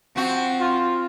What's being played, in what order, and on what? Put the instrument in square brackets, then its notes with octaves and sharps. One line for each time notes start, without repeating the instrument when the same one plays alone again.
[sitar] F3 F#4 [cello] C4
[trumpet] F4